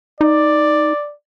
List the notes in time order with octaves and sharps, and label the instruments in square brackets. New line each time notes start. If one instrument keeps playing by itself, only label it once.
[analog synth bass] D#4 [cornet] D5